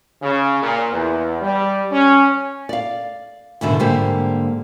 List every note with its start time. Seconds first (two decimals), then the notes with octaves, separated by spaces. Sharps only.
0.22 C#3
0.62 A#2
0.91 E2
1.41 G3
1.91 C#4
2.69 D5 F5
3.61 E2 G#2 B2 D3 D#3
3.79 G#2 D3 G3 A#3 G4 C5